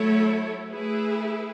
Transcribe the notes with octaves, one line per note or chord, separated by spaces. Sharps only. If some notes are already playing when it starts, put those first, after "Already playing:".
Already playing: F#3 A3 E4 A4 C#5
A3 E4 G#4 B4